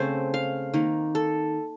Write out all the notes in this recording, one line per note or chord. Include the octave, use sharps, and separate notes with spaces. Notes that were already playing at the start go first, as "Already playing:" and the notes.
Already playing: C#3 A3 C4 C5
F5
D#3 A#3
A4